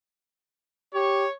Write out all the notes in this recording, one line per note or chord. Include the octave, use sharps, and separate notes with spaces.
G4 C#5